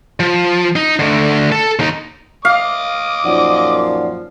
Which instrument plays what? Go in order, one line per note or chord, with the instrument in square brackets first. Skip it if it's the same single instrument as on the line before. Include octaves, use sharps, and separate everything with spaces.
[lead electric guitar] F3
D#4
D3 A3
A4
D#2 D#4
[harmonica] D#5 D6 D#6 [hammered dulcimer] F5
[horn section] F#2 A#2 F3 [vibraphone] D#4 D5 F#5